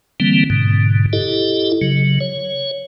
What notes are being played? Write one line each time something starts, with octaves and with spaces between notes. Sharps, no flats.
D3 E3 G3 A#3 C4
G#2 B2 D3
E4 G4 A4 D#5
C#3 F#3
C#5